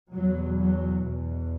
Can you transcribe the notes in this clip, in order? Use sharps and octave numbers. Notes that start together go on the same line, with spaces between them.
E2 B2 F#3
F#3
E2 B2